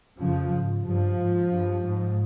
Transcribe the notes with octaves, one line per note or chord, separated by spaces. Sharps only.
F2 C#3 F3
G#2
G2 F3
G#2
G2
G#2